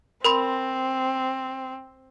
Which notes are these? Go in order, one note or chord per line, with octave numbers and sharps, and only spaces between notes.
C4 A#4 B5 C6